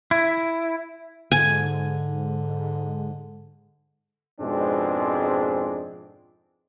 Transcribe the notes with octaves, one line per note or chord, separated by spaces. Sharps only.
E4
G#2 D3 G#5
F2 G#2 B2 G#3 C4 D4